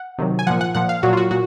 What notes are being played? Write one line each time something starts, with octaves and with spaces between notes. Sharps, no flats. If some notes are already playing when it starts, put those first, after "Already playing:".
Already playing: F#5
C3 D#3 F#3
G#5
A#2 F3 F#5
F#5
A#2 F3 F#5
F5
A#2 F#3 F#4
F4
F#4
A#2 F#4